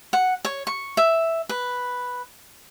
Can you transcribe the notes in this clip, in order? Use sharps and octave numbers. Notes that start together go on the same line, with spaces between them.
F#5
C#5
C#6
E5
B4